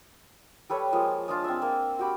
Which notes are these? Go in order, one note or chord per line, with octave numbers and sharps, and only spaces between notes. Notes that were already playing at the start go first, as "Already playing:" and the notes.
G3 A4 B4 C#5
F3 G#3 A#3
G#3 D4 F4 A5
C4 E5
A#3
F#4 G4 B5